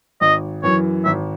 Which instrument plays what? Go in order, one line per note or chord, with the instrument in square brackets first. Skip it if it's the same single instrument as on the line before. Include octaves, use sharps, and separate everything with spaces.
[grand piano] G#1 [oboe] D#5
[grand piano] F#2 E3 [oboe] C#5
[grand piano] G#1 [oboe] E5